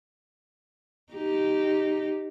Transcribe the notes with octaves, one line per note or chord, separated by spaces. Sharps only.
D#4 G4